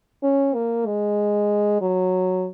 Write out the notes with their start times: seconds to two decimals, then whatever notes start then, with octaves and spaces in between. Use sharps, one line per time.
0.23 C#4
0.54 A#3
0.86 G#3
1.81 F#3